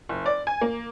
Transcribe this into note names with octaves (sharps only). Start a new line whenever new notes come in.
F#1
D5
G#5
A#3